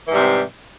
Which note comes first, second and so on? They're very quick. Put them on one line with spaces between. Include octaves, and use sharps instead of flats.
E3 G#2 G3 C3 C4